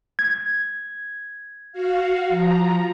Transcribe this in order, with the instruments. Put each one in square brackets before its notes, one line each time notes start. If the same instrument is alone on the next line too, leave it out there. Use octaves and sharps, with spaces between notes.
[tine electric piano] G#6
[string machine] F#4 F5
F3 A#5